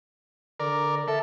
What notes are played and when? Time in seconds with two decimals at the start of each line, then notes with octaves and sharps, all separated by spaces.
0.60 D3 A#4 D5
1.08 A4 E5